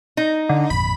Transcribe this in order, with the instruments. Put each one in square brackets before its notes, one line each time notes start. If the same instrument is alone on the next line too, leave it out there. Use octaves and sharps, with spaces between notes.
[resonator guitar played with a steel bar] D#4
[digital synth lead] D3
[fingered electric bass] G#1 F2 A#2 [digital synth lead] B5